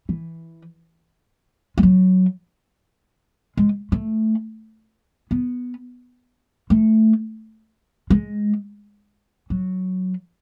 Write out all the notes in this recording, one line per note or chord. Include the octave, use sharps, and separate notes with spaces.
E3
G#3
F#3
G#3
A3
B3
A3
G#3
F#3